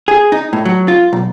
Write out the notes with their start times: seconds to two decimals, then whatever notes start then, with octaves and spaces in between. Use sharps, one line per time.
0.08 G#4
0.32 D#4
0.53 A2
0.65 F#3
0.88 F4
1.13 B1